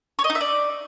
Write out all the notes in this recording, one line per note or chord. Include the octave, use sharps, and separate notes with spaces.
C#5
D#5
D#4
E5
D5